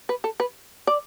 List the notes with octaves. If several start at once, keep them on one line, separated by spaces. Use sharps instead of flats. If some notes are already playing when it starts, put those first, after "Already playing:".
B4
A4
B4
D5